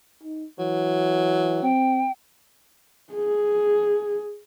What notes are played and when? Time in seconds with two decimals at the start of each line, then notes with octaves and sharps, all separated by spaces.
0.23 D#4
0.59 E3 F#3
1.62 C4 G5
3.14 G#4